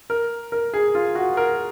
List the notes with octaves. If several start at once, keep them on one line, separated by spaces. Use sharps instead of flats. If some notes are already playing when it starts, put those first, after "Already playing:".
A#4
A#4
G#4
F4
F#4
A#4